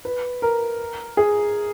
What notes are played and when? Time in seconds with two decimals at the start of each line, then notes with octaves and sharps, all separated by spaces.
0.05 B4
0.42 A#4
1.17 G#4